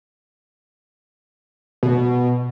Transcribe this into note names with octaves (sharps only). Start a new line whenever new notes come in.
B2